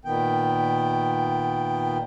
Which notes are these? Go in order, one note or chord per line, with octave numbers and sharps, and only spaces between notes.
A#2 D#3 B3 G5